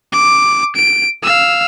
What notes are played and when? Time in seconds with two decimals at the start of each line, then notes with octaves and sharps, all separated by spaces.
0.12 D6
0.76 D7
1.23 F5 E6